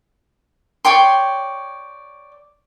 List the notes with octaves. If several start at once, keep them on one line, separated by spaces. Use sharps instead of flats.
C#5 D5 G5 C6